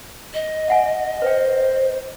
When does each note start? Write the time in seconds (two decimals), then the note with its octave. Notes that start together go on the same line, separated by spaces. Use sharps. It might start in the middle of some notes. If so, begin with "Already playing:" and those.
0.34 D#5
0.68 E5 F#5 G#5
1.22 B4 C5 G5